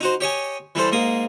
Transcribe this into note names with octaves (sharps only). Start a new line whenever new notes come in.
D#4 F#4 C5
G4 C#5 D#5 G#5
E3 G3 A4 C5
G#2 A#3 D#6